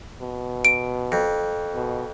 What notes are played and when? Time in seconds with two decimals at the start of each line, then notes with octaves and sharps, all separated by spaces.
0.21 B2
0.65 D7
1.12 F2
1.74 B2